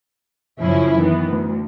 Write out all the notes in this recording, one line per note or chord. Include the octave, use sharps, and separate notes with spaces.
F#2 C#3 F3 C#4 E4
D#3 E3 B3
D2